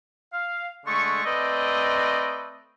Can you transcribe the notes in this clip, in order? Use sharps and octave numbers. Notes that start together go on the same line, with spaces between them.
F5
D3 G#3 A3 C#6
A3 C4 B4 D5 D#5